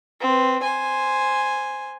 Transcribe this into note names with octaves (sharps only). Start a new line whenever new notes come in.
C4 B4
C5 G#5